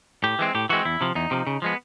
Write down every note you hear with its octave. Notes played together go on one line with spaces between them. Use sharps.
A2 G4
E3 G#3 C4
A2 G4
E3 G#3 C4 F#4
E2 E4
C3 F3
E2 D#4
C3 F3
C#3
F3 G#3 B3